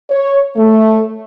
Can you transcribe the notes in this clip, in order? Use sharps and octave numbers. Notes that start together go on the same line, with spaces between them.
C#5
A3